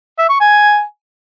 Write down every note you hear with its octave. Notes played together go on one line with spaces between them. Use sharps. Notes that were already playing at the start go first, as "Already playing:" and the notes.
E5
C#6
G#5